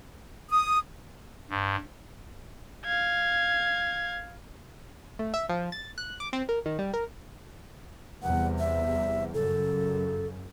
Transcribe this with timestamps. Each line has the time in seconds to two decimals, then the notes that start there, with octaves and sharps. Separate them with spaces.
0.50 D#6
1.50 G2
2.85 F5 G#6
5.19 A3
5.34 E5
5.49 F3
5.72 A6
5.98 F#6
6.20 D6
6.33 C4
6.49 A#4
6.66 D#3
6.79 G3
6.94 A#4
8.23 E2 C3 G3 F#5
8.59 E5
9.34 F#2 C#3 A4